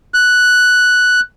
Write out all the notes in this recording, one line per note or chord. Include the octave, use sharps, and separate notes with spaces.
F#6